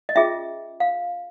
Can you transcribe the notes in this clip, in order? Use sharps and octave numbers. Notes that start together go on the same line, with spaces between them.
D#5
C#4 F4 G#4 E5
F5